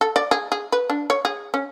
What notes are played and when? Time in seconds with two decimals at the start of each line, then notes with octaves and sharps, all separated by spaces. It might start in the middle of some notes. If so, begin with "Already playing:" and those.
0.01 A4
0.16 D5
0.31 G#4
0.52 G#4
0.72 B4
0.90 D4
1.10 C#5
1.25 G#4
1.54 C#4